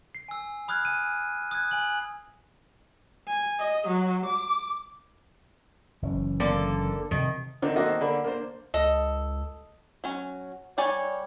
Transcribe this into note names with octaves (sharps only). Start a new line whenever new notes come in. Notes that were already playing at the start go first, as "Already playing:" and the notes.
C7
G#5 E6
B5 D#6 F6 F#6 G#6
G#5 D#7
D#6 F#6 G#6
G#5 F#7
G#5
D#5
F#3
D6
F#1 E3 C#4
D3 A#3 A4
C3 D#3 F3
D3 D#3 C4 D4 D#4
D#3 A#3 F#4 A4 C5 D#5
D3 A#3 D4 A4 B5
A#3 D4 C5
C#2 A4 D#5
F#3 C#4
G3 C#5 D5 G#5